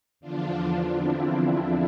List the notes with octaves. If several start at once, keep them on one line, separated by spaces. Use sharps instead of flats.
E2 D3 F3 D4 F4
C4 E4
C4